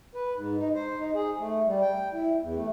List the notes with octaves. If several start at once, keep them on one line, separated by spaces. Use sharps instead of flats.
B4
G#2
D#4
C5
D#4
G#4
A3
G3
G5
E4
E2
A3